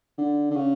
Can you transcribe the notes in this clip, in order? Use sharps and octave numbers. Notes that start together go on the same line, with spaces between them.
D3
D3
C#3